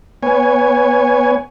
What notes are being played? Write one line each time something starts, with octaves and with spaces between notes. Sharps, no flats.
B3 C#5 G#5